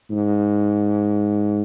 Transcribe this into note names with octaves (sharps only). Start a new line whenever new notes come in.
G#2